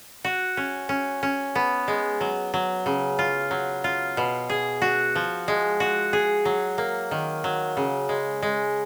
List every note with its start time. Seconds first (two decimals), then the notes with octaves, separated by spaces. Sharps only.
0.24 F#4
0.57 C#4
0.89 C#4
1.23 C#4
1.55 B3
1.88 G#3
2.21 F#3
2.54 F#3
2.86 C#3
3.19 F4
3.51 F#3
3.84 F4
4.17 B2
4.50 G#4
4.82 F#4
5.15 F3
5.48 G#3
5.80 F#4
6.13 G#4
6.45 F#3
6.78 A#3
7.11 D#3
7.44 F#3
7.77 C#3
8.09 G#3
8.42 G#3